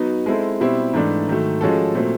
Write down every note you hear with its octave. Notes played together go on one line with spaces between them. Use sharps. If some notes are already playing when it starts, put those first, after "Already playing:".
Already playing: F#3 B3 D#4 F#4
G#3 C4 E4 A4
B2 G3 C4 E4 G4
G#2 E3 A3 D4
G#2 D#3 F#3 A3
F3 G#3 C#4 F#4 A4
A#2 F#3 A3 C4